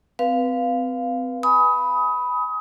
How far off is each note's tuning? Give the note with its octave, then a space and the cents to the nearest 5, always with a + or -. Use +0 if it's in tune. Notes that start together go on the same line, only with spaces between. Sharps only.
C4 -30 B4 -15 F5 +0
G#5 +0 B5 +0 D#6 +25